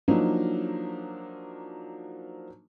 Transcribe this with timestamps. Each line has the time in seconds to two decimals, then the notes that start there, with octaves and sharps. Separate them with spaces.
0.08 F3 F#3 A#3 D4 D#4